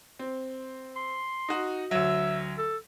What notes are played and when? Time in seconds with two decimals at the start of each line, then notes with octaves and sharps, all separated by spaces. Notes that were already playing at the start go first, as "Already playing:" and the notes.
0.19 C4
0.96 C6
1.48 D#4 F#4
1.91 D2 F#3 E5
2.58 A4